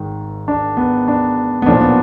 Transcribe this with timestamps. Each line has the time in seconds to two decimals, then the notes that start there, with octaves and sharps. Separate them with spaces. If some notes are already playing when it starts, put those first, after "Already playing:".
Already playing: G#1 G#2 D#3
0.48 D4
0.77 B3
1.08 D4
1.62 B3
1.66 B1 A#2 F3 D4
1.81 B3